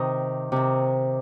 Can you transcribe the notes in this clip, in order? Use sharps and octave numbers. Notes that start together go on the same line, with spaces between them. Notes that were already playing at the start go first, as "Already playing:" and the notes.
Already playing: C3 D#3 D#5
C3 D#3